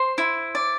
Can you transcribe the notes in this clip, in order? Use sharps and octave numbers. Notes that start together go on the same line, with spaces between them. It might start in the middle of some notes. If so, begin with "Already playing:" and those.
Already playing: C5 C6
E4
D5